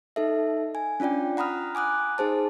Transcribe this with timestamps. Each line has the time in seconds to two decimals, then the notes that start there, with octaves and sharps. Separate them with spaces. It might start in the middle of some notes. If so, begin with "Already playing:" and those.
0.16 D#4 A4 E5
0.75 G#5
1.00 C#4 D4 F4 D5 G5
1.37 F#5 A#5 B5 D#6 F6
1.75 G#5 D6 D#6 F#6
2.18 D#4 G#4 C5 A5